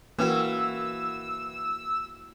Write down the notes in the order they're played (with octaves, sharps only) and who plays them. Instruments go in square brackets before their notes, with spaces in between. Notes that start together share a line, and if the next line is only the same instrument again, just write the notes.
[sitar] E3 [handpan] A#3 F#4 [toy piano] C#4 B4 G5 [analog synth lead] E6